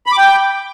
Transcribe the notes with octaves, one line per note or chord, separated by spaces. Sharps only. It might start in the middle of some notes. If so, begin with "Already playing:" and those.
B5
D6
G5